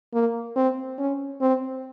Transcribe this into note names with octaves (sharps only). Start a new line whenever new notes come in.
A#3
C4
C#4
C4